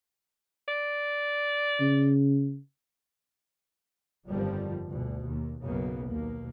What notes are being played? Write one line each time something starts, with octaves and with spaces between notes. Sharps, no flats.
D5
C#3
G1 F2 D3 D#3 F3 G3
D2 B2
D#2
B1 F#2 C#3 A#3 B3
D#2 B2 A#3